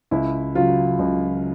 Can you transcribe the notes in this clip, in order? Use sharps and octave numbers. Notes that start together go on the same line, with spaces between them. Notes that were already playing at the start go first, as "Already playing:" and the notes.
C#2 E4
C#3 F#3 F4
C#2